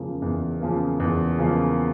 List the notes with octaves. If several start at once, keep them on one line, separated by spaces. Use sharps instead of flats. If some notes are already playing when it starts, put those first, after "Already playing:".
Already playing: E2 C#3 F3 A#3
E2
C#3 F3 A#3
E2
C#3 F3 A#3